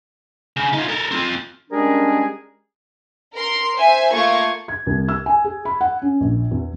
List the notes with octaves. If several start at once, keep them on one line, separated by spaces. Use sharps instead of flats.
C#3
D#4 F4
A4 A#4
C4 F4
G3 G#3 C#4 D4 G#4 A#4
A#4 C6
C5 E5 G#5
A3 A#3 F4 F5 C#6 G#6
G#6
C2
E6
G#5
G#4
B5
F#5
C#4
A#1
E2